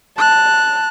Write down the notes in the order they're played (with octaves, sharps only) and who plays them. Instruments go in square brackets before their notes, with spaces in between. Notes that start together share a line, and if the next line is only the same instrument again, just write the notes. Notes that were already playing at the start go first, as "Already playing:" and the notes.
[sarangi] A5 [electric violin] F#6